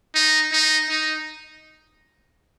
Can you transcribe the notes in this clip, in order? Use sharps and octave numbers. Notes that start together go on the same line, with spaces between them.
D#4
D#4
D#4